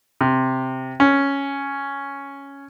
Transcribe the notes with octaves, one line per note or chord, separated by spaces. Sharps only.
C3
C#4